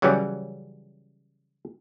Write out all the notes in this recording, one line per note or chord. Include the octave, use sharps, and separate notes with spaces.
C#3 E3 F#3 G3 C#4